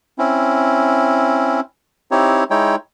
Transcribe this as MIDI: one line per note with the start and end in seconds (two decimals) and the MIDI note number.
0.18 1.60 60
0.18 1.60 61
0.18 1.60 64
2.11 2.44 60
2.11 2.44 63
2.11 2.44 64
2.11 2.44 67
2.11 2.44 73
2.50 2.76 56
2.50 2.76 63
2.50 2.76 64
2.50 2.76 73
2.50 2.76 79